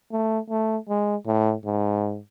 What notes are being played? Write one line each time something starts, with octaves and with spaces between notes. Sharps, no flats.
A3
A3
G#3
A2
G#2